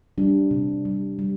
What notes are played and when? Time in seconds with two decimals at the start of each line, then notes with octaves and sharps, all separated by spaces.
0.18 G3 D4
0.51 C3
0.85 G3
1.19 G3